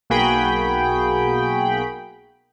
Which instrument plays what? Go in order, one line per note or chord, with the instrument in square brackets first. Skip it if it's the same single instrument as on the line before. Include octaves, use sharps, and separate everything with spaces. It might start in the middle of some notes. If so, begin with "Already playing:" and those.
[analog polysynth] B1 A#3 F#4 G#4 G5 B5